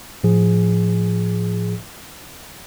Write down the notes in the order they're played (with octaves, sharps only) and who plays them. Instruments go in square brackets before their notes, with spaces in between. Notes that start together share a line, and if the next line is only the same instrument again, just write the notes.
[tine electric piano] A2 F3 G#4